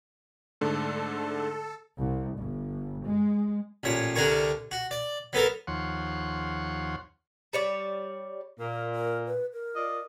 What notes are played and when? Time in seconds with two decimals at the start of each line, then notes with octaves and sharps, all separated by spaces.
0.61 G#2 D3 A3 A4
1.99 C2
2.39 G1
3.04 G#3
3.83 A1 A#2 C#5
4.16 C2 D3 D4 A#4 G#5 C#6
4.71 F#4
4.91 D5
5.33 F#3 B3 A4 A#4
5.67 D#2 F3 C#5 F#5 C6
7.53 G3 C#5 D5
8.59 A#2 A#4
8.95 A#4
9.26 B4
9.53 A#4
9.76 F4 D5 D#5